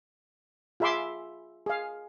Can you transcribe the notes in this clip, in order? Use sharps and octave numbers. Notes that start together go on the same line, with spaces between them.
F4 G#4 E5 B5 C6 D6
G#4 F5